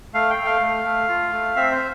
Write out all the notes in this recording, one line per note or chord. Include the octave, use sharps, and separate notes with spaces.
A3 F5
G5
A3
F5
A3
A3
F4
A3
C4 E5
C5